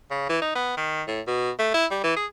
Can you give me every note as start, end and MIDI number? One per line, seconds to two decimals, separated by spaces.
0.11 0.27 49
0.29 0.39 52
0.42 0.53 63
0.55 0.77 59
0.77 1.02 51
1.08 1.21 45
1.27 1.51 47
1.59 1.73 57
1.74 1.86 64
1.91 2.00 55
2.04 2.14 52
2.16 2.26 68